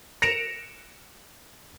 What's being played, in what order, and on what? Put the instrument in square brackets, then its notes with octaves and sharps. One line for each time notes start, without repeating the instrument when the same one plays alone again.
[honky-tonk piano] A#6 C#7 D7 E7 F7